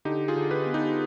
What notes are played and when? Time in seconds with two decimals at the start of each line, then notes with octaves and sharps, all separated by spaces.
0.05 D3 D#4 G4
0.28 F4 G#4
0.36 D3
0.50 G4 B4
0.66 B3
0.74 D#4 G4